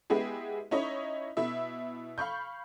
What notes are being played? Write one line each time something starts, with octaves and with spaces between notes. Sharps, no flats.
G#3 B3 E4 G4 G#4
C#4 D#4 E4 C#5 D#5
B2 E4 E5
F5 B5 C#6 G6